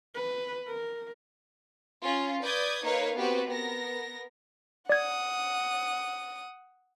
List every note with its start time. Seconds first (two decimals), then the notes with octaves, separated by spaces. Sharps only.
0.14 B4
0.67 A#4
2.02 C#4 F4
2.42 B4 D5 D#6 G6 G#6
2.83 A#3 D#4 A#4 B4 C#5 F5
3.16 B3 C4 F#4 G4 B4
3.48 B3 A#4 A#6
4.90 D5 F#5 D#6 G#6